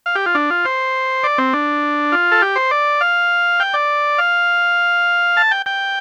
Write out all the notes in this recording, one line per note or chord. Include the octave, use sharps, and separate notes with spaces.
F5
G4
F4
D4
F4
C5
D5
C4
D4
F4
A4
G4
C5
D5
F5
G5
D5
F5
A5
G5
G5